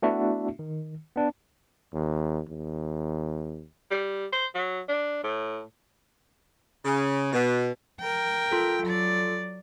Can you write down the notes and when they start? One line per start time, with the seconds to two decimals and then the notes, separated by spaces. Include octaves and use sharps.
0.03 A3 B3 D4 E4 F#4 E5
0.59 D#3
1.16 B3 D4
1.94 D#2
2.49 D#2
3.91 G3
4.32 C5
4.55 F#3
4.89 D4
5.24 A2
6.85 C#3
7.32 B2
8.00 A#4 G5
8.52 F4 A4
8.83 F#3 D5